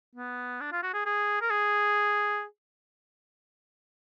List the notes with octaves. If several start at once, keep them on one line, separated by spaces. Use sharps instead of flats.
B3
D4
F4
F#4
G#4
G#4
A#4
G#4